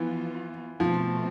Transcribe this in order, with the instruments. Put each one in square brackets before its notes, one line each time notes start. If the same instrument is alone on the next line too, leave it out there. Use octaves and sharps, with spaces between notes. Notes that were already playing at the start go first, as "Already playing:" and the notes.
Already playing: [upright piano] E3 [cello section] F3 B3 F4
[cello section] B2 A3 C4 [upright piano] F3